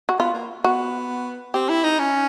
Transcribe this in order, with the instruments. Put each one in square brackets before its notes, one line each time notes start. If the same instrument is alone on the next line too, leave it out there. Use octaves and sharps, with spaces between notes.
[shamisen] F#4
[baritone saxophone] B3 [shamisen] F4
[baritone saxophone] A#3
[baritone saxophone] B3 [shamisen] F#4
[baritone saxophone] C4 [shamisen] G4
[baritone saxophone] E4
D#4
C#4